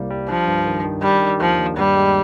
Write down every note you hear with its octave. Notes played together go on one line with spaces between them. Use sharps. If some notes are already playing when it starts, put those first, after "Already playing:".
Already playing: C2 G3 A#3
G3
F3 D4
G2
D#3
D#3
G3 D4
D#3
D#2 F3
D#2
G2 G3
G#3